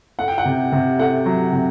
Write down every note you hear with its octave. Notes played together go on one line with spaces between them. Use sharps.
A3 F#5
G5
F#5
C3
C3
A3 F#5
F#3
C3